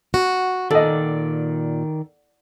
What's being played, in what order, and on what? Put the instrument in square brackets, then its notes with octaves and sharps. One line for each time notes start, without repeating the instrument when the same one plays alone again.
[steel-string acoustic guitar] F#4
[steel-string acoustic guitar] A#2 [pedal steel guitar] D#3 D5 [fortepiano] A4 D#5